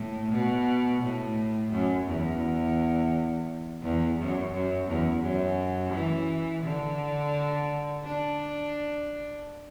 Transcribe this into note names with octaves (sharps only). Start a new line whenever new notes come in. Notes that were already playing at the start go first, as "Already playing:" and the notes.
Already playing: A2
B2
A2
F#2
E2
E2
F#2
F#2
E2
F#2
E3
D3
D4